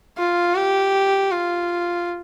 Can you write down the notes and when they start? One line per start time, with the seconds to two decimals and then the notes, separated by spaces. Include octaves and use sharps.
0.18 F4
0.56 G4
1.31 F4